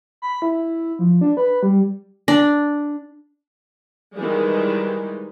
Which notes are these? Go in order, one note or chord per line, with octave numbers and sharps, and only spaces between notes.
B5
E4
F3
D4
B4
G3
D4
D#3 E3 G3 G#3